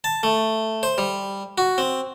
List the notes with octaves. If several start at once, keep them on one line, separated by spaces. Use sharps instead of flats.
A5
A3
C5
G3
F#4
C4